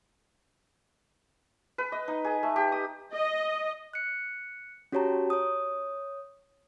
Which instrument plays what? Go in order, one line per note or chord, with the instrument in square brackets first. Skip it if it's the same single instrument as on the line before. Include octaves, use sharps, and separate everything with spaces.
[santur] B4
D#5
D#4
G#4
A3
G4
D#6
[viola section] D#5
[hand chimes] F#6 C#7
C#4 F#4 G4 C#5 A5 A#5
C#5 D#6